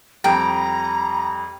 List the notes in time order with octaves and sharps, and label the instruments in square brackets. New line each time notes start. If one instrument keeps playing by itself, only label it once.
[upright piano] F2 G3 [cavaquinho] G5 [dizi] A#5